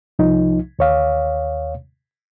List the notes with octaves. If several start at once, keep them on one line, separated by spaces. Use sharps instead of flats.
C2 F3 D#4
D#2 C#5 F5